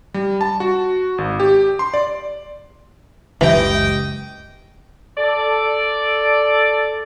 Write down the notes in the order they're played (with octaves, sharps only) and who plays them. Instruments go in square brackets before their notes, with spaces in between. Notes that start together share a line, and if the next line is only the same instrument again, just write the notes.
[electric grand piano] G3
A5
F#4
G#1
G4
C6
D5
[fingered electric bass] F#1 C#2 [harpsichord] E3 [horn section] G4 D#5 G5
[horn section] A4 D5